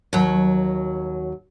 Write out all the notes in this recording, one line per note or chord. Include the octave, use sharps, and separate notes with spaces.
D#2 F#3